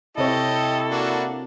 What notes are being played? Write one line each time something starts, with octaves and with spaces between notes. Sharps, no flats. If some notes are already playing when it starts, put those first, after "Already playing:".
C3 E4 G4 A4 C#5 D#5
A#3 D4 F#4